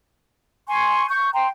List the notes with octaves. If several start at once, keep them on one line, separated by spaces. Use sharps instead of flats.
G#5 C6 C#6
C#6 G6
G5 A#5 C6